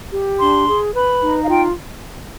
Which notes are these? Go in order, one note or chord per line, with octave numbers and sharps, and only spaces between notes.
G4
D4 C6
G#4
B4 B5
D#4
F5
F4 G5